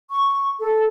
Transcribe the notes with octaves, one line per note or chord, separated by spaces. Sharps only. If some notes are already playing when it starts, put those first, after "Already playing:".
C#6
A4